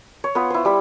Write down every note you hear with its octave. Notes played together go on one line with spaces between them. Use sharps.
C#5
B3 F4 B4
E4 C5
G3 B5